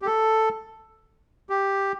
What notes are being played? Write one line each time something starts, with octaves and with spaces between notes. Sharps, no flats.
G4
A4
G4